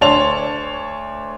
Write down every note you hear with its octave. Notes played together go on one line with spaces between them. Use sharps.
D2 C#5 D5 A5 C6 F7